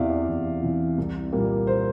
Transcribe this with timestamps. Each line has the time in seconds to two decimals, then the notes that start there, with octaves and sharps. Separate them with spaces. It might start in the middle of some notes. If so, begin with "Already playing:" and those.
Already playing: E2 C3 E3 D5 E5 F5
0.10 D5
0.28 E2
0.63 C3 E3
0.98 C2
1.32 A#2 G3 A#3
1.67 C5